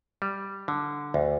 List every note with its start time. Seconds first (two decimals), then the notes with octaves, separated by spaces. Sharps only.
0.22 G3
0.68 D3
1.14 D2